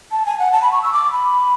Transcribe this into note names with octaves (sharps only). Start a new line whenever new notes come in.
A5
G#5
F#5
A5
B5
C#6
E6
D6
B5